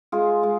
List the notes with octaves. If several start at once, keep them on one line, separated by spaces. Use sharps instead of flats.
G#3 F4 G#4
G#3